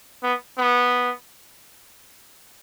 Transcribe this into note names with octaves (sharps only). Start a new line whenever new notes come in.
B3
B3